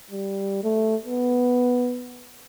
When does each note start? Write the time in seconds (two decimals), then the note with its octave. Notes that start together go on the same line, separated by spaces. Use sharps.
0.11 G3
0.64 A3
1.05 B3